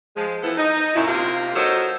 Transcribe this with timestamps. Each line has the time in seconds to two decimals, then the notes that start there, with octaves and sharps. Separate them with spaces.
0.16 F3 G#3
0.42 E3 F3 B3 E4 A4
0.57 D#4
0.94 F#2 A#2 E4
1.07 C3 A#3 F4
1.54 F#3 D#4 A4 A#4 C5